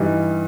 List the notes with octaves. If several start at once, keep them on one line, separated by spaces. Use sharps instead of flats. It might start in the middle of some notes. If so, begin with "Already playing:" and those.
Already playing: G2 E3 G3 D#4